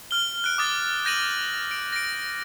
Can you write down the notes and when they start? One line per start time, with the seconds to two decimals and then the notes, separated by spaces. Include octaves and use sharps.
0.11 F6 G7
0.44 F#6 D7
0.58 D6 D#6 A6
1.05 G6 A#6 D#7 F#7
1.71 D7
1.92 A#6 D7